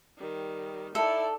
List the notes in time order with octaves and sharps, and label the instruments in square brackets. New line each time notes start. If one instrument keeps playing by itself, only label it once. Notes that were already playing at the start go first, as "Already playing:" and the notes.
[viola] D#3 G3
[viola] D#4 D5 [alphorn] E4 [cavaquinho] A4